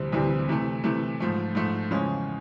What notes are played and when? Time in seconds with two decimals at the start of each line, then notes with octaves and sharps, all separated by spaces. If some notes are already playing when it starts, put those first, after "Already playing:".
Already playing: D2 C3 E3 G3 C4
0.12 D2 C3 E3 G3 C4
0.49 C3 E3 A3
0.84 C3 E3 A3
1.20 G#2 F3 A3
1.55 G#2 F3 A3
1.91 E2 C#3 F3 G#3 C#4